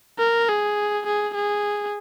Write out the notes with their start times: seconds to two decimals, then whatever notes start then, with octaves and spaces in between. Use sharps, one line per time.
0.19 A#4
0.48 G#4
1.06 G#4
1.35 G#4